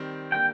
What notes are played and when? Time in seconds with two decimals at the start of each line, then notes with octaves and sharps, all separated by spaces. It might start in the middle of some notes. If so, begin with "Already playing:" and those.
Already playing: D#3 G3 C4
0.32 D3 G3 A#3 G5